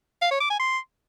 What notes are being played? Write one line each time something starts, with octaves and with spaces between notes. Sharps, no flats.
F5
C#5
D6
G#5
C6